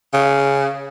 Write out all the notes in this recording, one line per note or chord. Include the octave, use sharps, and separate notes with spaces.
C#3